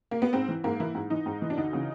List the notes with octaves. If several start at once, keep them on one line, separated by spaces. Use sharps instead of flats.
A#3
B3
G#2 C4
E3
G#2 A#3
E3 E4
G#2
E3 D#4
G#2
E3
D4
D2 D#4
C#3 E3